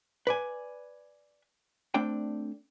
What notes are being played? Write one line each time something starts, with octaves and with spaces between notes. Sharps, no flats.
B4 D5 G#5
A3 C4 D4 D5 G5